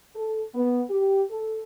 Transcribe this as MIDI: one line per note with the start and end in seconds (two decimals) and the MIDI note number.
0.16 0.42 69
0.54 0.82 59
0.90 1.23 67
1.30 1.63 69